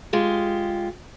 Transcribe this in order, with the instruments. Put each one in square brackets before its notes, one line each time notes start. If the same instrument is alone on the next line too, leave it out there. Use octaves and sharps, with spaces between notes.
[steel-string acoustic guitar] G#3 F4 G4